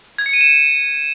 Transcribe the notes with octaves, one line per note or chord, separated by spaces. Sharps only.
G#6
C#7
D#7
E7